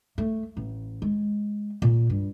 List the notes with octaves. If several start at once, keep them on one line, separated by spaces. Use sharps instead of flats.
A3
A1
G#3
A#2
G2